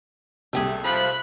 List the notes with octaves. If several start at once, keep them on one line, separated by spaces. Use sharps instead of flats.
C2 C3 A3 G4 G#4
F3 B5 F#6